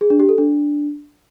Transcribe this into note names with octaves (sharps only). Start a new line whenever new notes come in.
G#4
D4
G4
A4
D4